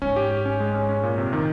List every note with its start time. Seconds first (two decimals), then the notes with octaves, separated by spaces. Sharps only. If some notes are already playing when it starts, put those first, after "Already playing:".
0.02 G#2 C#4
0.16 G4
0.31 G4
0.45 C#4
0.60 G#3
0.74 C#4
0.89 C#4
1.03 A#2
1.18 C3
1.33 D#3